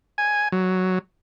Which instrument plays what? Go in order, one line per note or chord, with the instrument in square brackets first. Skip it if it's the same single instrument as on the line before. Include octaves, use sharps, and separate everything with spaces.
[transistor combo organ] G#5
F#3